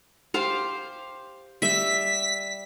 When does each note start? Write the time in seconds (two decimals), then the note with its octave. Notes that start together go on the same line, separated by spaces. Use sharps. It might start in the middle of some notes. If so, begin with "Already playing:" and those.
0.34 G4 C5 F5
1.62 G3 E5 B6